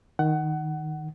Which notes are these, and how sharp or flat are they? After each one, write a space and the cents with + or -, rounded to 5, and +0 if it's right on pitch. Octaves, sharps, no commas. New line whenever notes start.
D#3 +0 F#5 +20